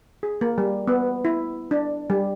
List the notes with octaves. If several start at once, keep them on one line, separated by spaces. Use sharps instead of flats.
G#4
A#3
G3
B3
E4
D4
G3